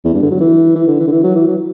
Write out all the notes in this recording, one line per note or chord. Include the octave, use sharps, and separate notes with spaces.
E2
G2
D3
F#3
E3
E3
D3
E3
D3
E3
F#3
E3
F#3